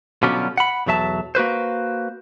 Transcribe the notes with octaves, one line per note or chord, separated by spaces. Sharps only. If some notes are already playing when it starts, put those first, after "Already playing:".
B2 D3 F#3 G3 C#4 F4
F#5 B5
B1 E2 F#3 E5 A5
A#3 F#4 B4 C5